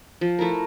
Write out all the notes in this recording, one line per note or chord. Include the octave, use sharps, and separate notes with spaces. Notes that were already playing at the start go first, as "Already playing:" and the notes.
F3
A3 E4 A#4